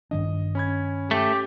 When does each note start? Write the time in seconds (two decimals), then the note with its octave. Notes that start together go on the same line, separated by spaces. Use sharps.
0.11 G2 D#3 D4 D#5
0.55 C#4 B5 G#6
1.11 A3 G4